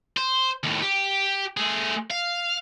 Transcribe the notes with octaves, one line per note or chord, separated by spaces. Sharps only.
C5
D#2 A2
G4
A3 G#4
F5